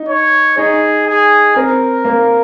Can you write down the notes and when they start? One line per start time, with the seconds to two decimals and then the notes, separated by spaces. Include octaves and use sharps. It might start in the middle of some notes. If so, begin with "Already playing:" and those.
Already playing: D#4
0.09 C#5
0.58 D#4 G#4
1.07 G#4
1.56 C4 A#4
2.05 A#3